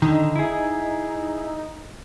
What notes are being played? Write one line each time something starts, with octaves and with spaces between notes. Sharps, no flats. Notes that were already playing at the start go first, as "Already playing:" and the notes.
D3 D#3 D#4
E4 G#4